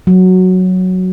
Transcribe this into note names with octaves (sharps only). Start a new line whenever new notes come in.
F#3